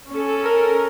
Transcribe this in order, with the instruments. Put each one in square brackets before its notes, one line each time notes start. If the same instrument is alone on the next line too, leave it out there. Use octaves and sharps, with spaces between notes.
[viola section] C#4 A4
[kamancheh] A#4